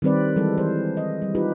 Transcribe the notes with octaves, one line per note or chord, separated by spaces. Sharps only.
D#3 G3 C4 B4 D5
E3 G3 G#3 A4
E3 C5
D#5
G3
D#4 F4 G4 B4